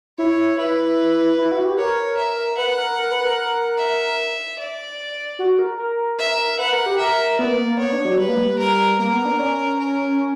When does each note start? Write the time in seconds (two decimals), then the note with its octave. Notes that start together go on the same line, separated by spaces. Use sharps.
0.18 E4 C#5
0.57 E4 B4
1.38 E4
1.52 F#4
1.65 G4
1.78 A#4 C#5
2.17 E5
2.58 B4 F#5
2.78 A#4
2.98 A#4
3.11 B4
3.25 A#4
3.77 E5
4.59 D5
5.39 F#4
5.59 A#4
5.78 A#4
6.18 E5
6.58 B4 F#5
6.73 A#4
6.86 G4
6.98 A#4 E5
7.39 B3 D5
7.52 A#3
7.65 A#3
7.78 B3 C#5
7.92 D4
8.05 F#3
8.18 G3 B4
8.29 A#3
8.39 G3
8.59 A#4
8.99 A#3 A#4
9.12 B3
9.25 D4
9.39 C#4
9.79 A#4